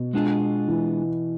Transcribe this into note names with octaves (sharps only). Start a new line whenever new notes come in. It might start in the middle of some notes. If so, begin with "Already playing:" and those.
Already playing: B2
G#3 B3 D4 F4 G#4
E3